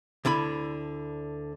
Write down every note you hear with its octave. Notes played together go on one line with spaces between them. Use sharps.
D2 D3 E4 B5